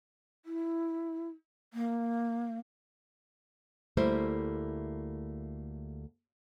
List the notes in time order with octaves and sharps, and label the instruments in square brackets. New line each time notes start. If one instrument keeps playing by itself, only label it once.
[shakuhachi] E4
A#3
[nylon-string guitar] D2 G3 A3 A#3 E4 C5